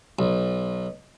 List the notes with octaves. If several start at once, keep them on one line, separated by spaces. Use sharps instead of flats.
B1